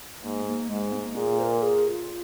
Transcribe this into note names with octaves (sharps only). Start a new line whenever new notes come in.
G#2 A#3
A#3
G#2 G#3
C4
A#3
A#2 G#4
C5
A#4
G#4
G#4
F4